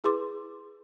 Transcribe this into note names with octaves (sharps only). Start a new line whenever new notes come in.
E4 G#4 B4 C6 D6